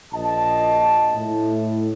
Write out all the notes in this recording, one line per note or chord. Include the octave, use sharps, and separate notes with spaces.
A#1 D#5 A5
A2